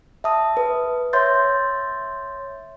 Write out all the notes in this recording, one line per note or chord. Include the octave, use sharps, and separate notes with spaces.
E5 A5 D#6
B4
C#5 E5 C6 G6 A6